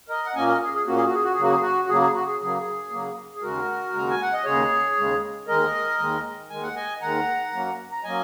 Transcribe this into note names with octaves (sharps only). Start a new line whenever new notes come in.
A#4 D#5
F#5
A#2 A#3 C#4 D#5 G#5
A#4 D#5
G#4
G#4
A#2 A#3 C#4 F#4
G#4
F#4
G#4
F#4
G#4
C#3 F#3 A#3 F#4
G#4
F#4
F#4
C#3 F#3 A#3 G#4
G#4
F#4
G#4
C#3 F#3 A#3 G#4
C#3 F#3 A#3
G#4
D#2 C#3 G#3 F#4 A#4
D#2 C#3 G#3 A#5
G#5
F#5
D#5
D#2 C#3 G#3 G#4 C#5
D#2 C#3 G#3
D#2 D#3 G#3 A#4 D#5
D#2 D#3 G#3
D#2 D#3 G#3 G#5
F#5
D#5 G#5
D#2 D#3 G#3 F#5 A#5
F#2 F#3 A#3 C#4
A#5
F#3 A#3 C#4 D#5 G#5